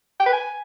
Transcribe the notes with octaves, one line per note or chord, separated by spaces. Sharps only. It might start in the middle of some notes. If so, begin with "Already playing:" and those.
G5
B4
G#5